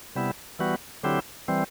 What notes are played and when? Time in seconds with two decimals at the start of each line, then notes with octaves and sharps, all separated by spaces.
0.15 C3 G3 B3 E4
0.59 E3 G3 B3 F#4
1.03 D3 F#3 C4 E4 G4
1.48 E3 G3 C4